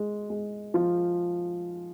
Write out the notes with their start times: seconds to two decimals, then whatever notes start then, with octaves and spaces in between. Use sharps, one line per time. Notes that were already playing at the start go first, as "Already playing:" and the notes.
Already playing: G#3
0.30 G#3
0.74 F3